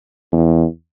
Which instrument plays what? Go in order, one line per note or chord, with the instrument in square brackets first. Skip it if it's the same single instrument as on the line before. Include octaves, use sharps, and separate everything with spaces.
[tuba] E2